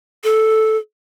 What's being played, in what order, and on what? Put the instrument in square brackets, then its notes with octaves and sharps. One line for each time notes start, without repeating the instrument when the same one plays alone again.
[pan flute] A4